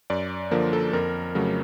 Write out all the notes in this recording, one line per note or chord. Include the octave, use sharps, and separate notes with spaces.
F#2 D5
D3 F3 A#3 A#4
A4
F2 A#4
C#3 F#3 A3